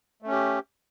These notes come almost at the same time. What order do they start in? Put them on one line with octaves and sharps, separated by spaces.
A3 C#4 G4